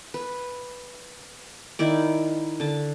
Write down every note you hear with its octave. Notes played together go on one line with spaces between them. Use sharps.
B4
D#3 E4 D5
D3 A5